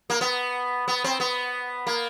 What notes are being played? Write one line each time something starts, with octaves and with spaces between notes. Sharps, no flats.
A#3
B3
B3
C4
B3
A#3